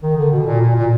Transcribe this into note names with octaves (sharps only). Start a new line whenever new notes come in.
D#3
D3
B2
A#2
A#2
A#2